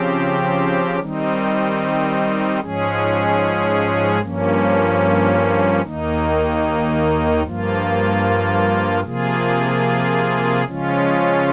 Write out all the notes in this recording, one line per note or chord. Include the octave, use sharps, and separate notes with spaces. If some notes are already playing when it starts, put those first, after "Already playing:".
Already playing: C#3 F3 C4 G4
D#3 G3 C4 D#4
G#2 F3 G#3 C#4 G#4
G2 F3 A#3 C#4
D#2 D#3 A#3 D#4
G2 F3 A#3 F4
C3 F3 A#3 F4 G#4
C#3 F3 G#3 C#4 F4